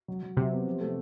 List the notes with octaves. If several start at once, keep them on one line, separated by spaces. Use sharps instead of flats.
F#3
F#3
C3 F#3
B3
F3
A3